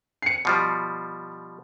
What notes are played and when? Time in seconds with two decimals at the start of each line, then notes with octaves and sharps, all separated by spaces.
0.22 C7 C#7
0.45 B2 F3 G3